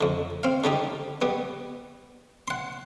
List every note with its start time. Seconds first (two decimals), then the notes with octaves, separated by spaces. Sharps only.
0.01 F2 D3
0.43 C4 F5
0.64 D3 G3 D#4 G4
1.22 G3 B3
2.48 F#5 C6